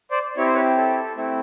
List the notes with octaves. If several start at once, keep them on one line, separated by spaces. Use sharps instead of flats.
C5 D5
C4 E4 G4 C#5
C5
B4 C#5
A4
A3 C4 E4